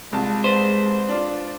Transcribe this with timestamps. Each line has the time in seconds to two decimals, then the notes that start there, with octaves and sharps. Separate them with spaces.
0.12 C2 G#3 F4 A5
0.44 B4 C5
1.09 D4 F4